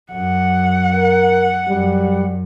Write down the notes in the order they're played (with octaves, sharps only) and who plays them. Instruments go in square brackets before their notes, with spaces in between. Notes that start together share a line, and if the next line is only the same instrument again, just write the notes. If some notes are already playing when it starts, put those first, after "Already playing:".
[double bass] F#2 [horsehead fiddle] F#5
[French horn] A#4
[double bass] F#2 [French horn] G3